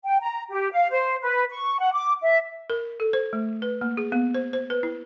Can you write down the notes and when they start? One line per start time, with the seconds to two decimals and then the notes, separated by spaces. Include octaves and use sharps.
0.04 G5
0.20 A#5
0.50 G4
0.72 F5
0.89 C5
1.21 B4
1.50 C#6
1.79 F#5
1.93 D6
2.22 E5
2.70 A#4
3.00 A4
3.13 C5
3.33 A3
3.62 B4
3.81 A#3
3.97 G#4
4.12 B3
4.35 C5
4.53 C5
4.70 B4
4.83 E4